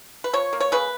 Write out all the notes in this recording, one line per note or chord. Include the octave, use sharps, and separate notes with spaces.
B4
F3 C#5
A#3
C#5
C#3 B4